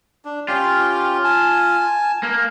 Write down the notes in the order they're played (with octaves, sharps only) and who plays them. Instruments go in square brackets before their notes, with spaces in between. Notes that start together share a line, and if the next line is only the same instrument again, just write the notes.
[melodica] D4
[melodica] C#4 G4 G5 [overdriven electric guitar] F4
[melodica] G#5 A5
[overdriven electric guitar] A#3